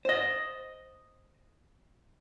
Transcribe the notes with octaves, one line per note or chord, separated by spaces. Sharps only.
C5 D#5